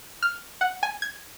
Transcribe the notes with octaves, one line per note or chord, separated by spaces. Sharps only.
F6
F#5
G#5
G#6